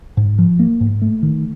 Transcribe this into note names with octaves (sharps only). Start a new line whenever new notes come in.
G#2
F3
A#3
G#2
A3
D#3